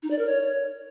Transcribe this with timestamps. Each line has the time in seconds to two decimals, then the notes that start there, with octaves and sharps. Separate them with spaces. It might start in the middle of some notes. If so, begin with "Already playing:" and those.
0.03 D#4
0.11 D5
0.19 A#4
0.26 C#5